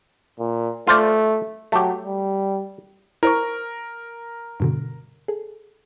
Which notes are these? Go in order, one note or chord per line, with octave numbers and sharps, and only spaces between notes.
A#2
A3 F4 C5 D5
F#3 A3 G4
G3
E4 A#4 C5 C#6
G2 B2 D3
G#4 A4